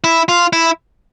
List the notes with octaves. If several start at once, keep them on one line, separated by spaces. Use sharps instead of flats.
E4
F4
E4